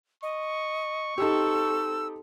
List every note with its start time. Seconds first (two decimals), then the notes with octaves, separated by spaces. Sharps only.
0.23 D#5 C#6
1.18 C4 D#4 G4 A4 E6